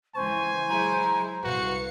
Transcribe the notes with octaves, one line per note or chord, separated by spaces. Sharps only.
C#2 E3 C5 G#5 C#6
F#3 G#3 E4 A#5
C2 F#4 B4 F5 C#7